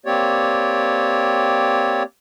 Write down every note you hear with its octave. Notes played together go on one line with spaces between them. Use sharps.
A#3 C4 G4 C#5 D5